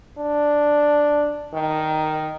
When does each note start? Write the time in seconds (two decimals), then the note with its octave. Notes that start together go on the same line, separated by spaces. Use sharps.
0.18 D4
1.54 D#3